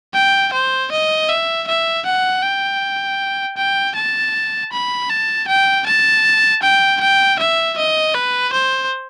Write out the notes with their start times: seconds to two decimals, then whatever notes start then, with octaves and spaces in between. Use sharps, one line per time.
0.14 G5
0.53 C5
0.91 D#5
1.29 E5
1.67 E5
2.06 F#5
2.43 G5
3.57 G5
3.95 A5
4.72 B5
5.10 A5
5.48 G5
5.86 A5
6.62 G5
7.01 G5
7.39 E5
7.77 D#5
8.15 B4
8.53 C5